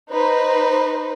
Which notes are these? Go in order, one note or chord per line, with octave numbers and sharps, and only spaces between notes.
D#4 B4 C5